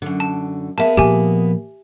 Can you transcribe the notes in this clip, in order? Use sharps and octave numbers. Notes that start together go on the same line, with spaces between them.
F#2 D3
A5
A#3 B3 G#4 E5 A5
A#2 F3 G4 G#5